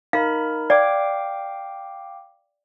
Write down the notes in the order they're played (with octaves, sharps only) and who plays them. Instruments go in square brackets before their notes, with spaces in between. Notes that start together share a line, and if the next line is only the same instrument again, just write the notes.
[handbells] D#4 A#4 B5 [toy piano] F5
[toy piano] D5 [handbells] F5 G5 D6